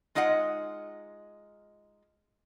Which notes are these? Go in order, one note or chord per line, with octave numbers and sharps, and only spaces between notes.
G#3 D#4 F4 D#5 F#5